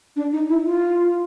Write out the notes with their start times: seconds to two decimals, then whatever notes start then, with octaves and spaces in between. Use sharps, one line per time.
0.16 D4
0.33 D#4
0.49 E4
0.65 F4